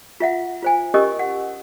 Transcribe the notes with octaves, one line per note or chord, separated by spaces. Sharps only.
F4 E5 F#5
F4 C5 G#5
C#4 G4 A#4 D#5 C#6 D#6
F#5